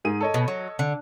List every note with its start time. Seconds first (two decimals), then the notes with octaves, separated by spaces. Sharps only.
0.04 G#2 G#4 D#7
0.21 A4 C#5 D#5
0.34 B2
0.48 F#3
0.79 D3